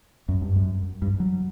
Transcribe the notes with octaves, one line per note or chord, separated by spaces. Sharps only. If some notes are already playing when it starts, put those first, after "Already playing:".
F#2
G2
F#2
G2
F#3